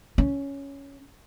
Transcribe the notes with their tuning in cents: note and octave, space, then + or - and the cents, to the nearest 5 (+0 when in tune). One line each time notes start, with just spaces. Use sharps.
C#4 +5